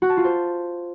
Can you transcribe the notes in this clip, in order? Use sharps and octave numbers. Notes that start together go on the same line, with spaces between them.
F#4
A5
F4
C5